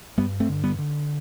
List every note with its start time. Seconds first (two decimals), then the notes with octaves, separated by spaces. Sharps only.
0.18 G2 G3 B3
0.40 A3 C4
0.49 D3
0.64 G3 B3
0.78 D3